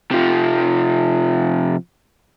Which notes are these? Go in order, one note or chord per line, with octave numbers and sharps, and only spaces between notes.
C3 F3